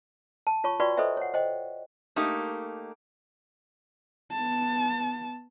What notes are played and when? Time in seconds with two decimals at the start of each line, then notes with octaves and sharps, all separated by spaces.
0.47 A5
0.64 F4 C#5 A5 C#6
0.79 F4 F#4 B4 D5 G5 C#6
0.97 A4 B4 C5 D#5 E5 G5
1.17 C#5 F#5
1.34 C5 D#5 G5
2.16 A3 A#3 D#4 G4
4.31 B3 A5